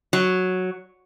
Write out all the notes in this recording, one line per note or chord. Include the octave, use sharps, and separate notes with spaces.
F#3